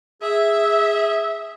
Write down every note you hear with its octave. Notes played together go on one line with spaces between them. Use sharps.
G#4 E5